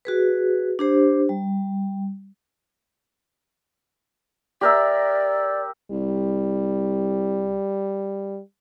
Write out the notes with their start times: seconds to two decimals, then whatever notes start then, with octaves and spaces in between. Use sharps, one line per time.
0.05 F#4 G#4 B4
0.79 D4 G4 C5
1.29 G3
4.61 G4 A#4 D5 E5
5.91 C2 G3